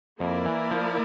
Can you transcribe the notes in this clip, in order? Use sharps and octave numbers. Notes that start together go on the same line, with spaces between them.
F2 A#3 E4 A#4 D5
E3
F3